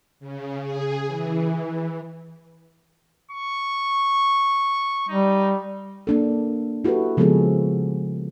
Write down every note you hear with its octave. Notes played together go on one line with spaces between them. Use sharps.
C#3
G#4
E3
C#6
G3 D#4
A#3 D4 A4
E4 F#4 G4 A4 B4
C#3 F3 G#3 B3 G#4 A4